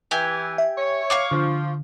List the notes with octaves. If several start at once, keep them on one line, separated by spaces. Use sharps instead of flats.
E3 G4 G#5
E5
C#5
F5 C#6 D6
D3 F3